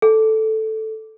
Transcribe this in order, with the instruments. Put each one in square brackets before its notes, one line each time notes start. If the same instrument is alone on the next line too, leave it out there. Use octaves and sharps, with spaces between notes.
[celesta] A4